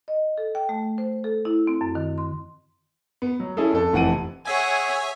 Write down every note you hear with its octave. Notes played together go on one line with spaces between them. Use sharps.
D#5
A4
G5
A3
C5
A4
E4
C4
F#2
D#3
C6
B3
F#3
C#4 E4 G#4 A4
F2 A4
F1 E3 C4 F#5 A5 D#7
G#4 C#5 E5 F#5 G#5